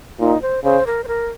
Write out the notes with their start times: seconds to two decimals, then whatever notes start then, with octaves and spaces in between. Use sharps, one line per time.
0.20 A#2 D#4
0.42 C5
0.64 C#3 C5
0.87 A#4
1.04 C5
1.08 A#4